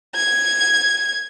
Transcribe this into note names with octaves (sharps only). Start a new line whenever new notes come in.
G#6